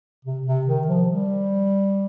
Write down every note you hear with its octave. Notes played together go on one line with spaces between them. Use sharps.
C3
C3
D#3
F3
G3